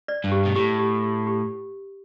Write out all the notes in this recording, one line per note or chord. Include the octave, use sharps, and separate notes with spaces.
D5
G2
G4
B2
A2 G4
G4
G4
G4